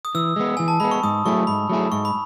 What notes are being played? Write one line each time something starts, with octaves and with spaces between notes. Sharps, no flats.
D#6
E3 E6
G#3 B3
E3 G#5
A5
G#3 B3 B5
C#6
G#2 D#6
F#3 A3 E4 G#4 C#6
G#2 B5
F#3 A3 E4 G#4
G#2 C#6
B5